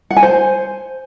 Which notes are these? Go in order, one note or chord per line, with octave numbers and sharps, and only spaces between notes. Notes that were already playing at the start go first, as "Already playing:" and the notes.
F#5
G#5
C5